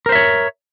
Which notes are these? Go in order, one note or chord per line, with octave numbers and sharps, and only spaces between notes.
A#4 C5 C#5 E5